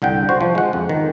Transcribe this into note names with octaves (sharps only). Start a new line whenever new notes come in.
C2 D3 F#5 G5
F#4 C5
F3
G#3 F#5
F2
D#3